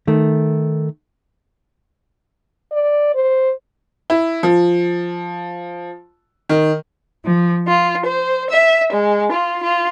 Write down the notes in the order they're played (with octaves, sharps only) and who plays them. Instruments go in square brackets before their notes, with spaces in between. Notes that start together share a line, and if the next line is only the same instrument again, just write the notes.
[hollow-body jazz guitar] D#3 A3
[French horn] D5
C5
[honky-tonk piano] E4
F3
D#3
[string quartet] F3
F4
C5
E5
G#3
F4
F4